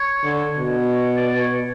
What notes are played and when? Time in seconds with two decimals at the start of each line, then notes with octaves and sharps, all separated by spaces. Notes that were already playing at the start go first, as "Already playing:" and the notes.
Already playing: C#5
0.24 D3
0.58 B2
0.93 C#5
1.16 D5
1.39 C#5